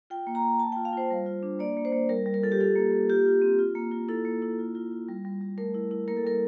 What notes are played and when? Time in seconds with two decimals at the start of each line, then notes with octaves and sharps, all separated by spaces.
0.10 F4 G5
0.27 A#3
0.35 A#5
0.44 A#3
0.60 A#3 A5
0.72 G5
0.76 F4
0.85 F5
0.93 F4 C5
1.11 G3
1.26 F4
1.43 D4
1.59 A#3 D5
1.77 A#3
1.85 C5
1.92 A#3
2.09 G3 A#4
2.26 G3
2.34 A#4
2.43 F4 A4
2.52 G4
2.59 F4 A4
2.76 A#3
2.92 A#3
3.09 F4 G4
3.26 F4
3.42 C4
3.59 F4
3.75 A#3
3.92 F4
4.09 E4 A4
4.25 A#3
4.42 E4
4.59 F4
4.75 F4
4.92 F4
5.08 G3
5.25 G3
5.41 G3
5.58 A3 A#4
5.75 E4
5.91 E4
6.08 A#3 A#4
6.17 A4
6.24 G3 A#4